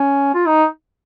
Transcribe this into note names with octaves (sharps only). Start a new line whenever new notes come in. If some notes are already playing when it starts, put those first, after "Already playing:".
Already playing: C#4
F4
D#4